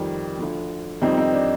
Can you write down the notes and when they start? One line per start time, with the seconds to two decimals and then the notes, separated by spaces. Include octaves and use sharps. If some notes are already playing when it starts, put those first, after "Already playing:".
Already playing: F2 D#3 G3
0.39 D2 D3 F3
1.02 F2 D#3 G3 C4 D#4
1.17 C4 D#4
1.33 D4